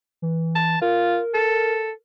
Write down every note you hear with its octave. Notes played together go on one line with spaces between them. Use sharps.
E3
A5
F4 A#4
A4